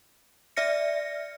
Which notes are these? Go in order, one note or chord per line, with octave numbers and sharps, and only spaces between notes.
D5 E5 F6 A#6 C#7